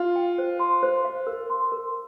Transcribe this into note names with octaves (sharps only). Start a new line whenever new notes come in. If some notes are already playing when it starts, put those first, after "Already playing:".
Already playing: F4
G5
C5
C6
C5
F5
A#4
C6
A#4